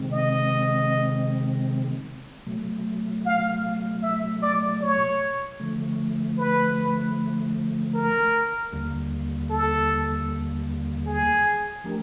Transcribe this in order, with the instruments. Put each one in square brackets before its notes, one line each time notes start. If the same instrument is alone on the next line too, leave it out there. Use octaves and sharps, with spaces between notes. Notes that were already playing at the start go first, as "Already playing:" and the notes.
Already playing: [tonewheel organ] C3 D#3 G#3 C4
[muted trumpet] D#5
[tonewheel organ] B2 F#3 A3
[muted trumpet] F5
E5
D5
C#5
[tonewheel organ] D3 F3 A3
[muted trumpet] B4
A#4
[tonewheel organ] D#2 D3 G3 A#3
[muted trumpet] A4
G#4
[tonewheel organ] F3 A3 D4 G4 A#4